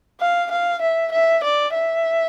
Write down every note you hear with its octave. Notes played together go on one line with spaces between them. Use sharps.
F5
F5
E5
E5
D5
E5